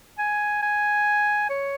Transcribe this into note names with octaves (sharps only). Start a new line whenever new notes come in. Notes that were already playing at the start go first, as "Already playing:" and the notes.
G#5
G#5
C#5